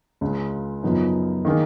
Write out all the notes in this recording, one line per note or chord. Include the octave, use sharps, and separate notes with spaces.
C#2 C#3 G#3
F#2 C#3 F3 B3 D#4
D#3 A#3 D#4 G#4